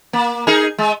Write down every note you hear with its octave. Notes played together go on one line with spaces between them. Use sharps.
A#3
D#4 G#4 A#4
G#3